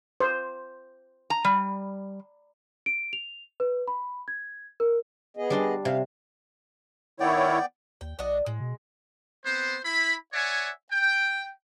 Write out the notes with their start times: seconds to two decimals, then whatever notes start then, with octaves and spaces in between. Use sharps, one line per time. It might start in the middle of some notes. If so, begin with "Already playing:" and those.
0.20 C5
1.30 A#5
1.44 G3
2.86 D7
3.13 F7
3.60 B4
3.88 B5
4.28 G#6
4.80 A#4
5.37 B3 G#4 D#5
5.50 G3 D4 C6
5.85 C3 F5
7.20 D#3 B3 E4 C#5 D5 G5
8.01 D#2 G5
8.19 B1 D4 F#4 D#5
8.46 A2 G#3
8.60 B2
9.45 B3 C4 C5
9.85 E4 B5
10.33 C#5 D5 E5 F#5 G#5
10.92 G5